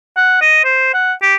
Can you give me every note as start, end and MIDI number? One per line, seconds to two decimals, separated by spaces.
0.17 0.40 78
0.42 0.62 75
0.65 0.93 72
0.94 1.13 78
1.22 1.36 67